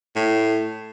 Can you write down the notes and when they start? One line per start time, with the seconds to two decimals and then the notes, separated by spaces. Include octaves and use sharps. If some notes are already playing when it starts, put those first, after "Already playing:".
0.16 A2